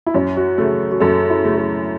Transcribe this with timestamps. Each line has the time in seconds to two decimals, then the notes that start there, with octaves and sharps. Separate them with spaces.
0.06 E4
0.14 F#2 C#4
0.36 F#4
0.58 C#3 A3 A4
0.91 F#4
1.00 F#2 A4
1.30 E4
1.44 C#3 A3
1.58 A4